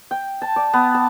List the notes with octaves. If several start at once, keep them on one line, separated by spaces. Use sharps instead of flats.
G5
A5
D5
B3
A5